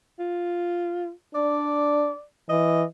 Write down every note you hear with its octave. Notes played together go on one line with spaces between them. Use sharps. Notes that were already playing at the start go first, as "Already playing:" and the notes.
F4
D4 D5
E3 D#5